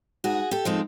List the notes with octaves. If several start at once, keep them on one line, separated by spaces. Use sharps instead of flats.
G#2 F#4 G#4
G4 A4
F3 G#3 C4 D#4